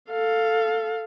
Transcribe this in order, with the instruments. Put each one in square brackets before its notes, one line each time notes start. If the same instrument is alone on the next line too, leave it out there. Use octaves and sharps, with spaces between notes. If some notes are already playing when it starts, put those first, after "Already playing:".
[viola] A4 F5